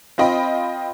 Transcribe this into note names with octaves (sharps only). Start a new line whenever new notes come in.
C4 F4 D#5 G5 B5